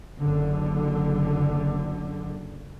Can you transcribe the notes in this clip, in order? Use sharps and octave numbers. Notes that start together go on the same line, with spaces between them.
F#1 D3